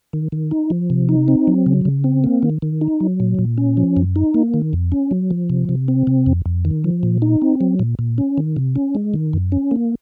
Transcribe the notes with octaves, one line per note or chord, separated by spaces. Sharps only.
D#3
D#3
D#4
F3
C3
D#4
C4
F#3
C#3
C#3
C4
A#3
D#3
D#3
D#4
F#3
A#2
A#2
C#4
F3
F#2
D#4
A#3
D#3
F2
C#4
F#3
F3
C3
C3
C4
C3
F2
F2
D#3
F3
A#2
D#4
C4
F#3
A#2
A#2
C#4
D#3
C3
C#4
G#3
D#3
F#2
C#4
A#3